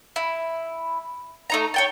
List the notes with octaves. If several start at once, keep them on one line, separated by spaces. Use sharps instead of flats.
E4
A3 D#4 A#5
C#5 G5 A5